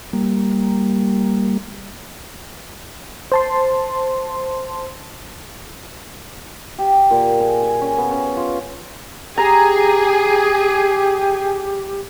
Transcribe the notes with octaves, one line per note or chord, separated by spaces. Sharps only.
G3 A#3
C5 A5 C6
G4
A#2
G#4
G#5
C#4
B3
C#4
F4
G4 G#4 A#5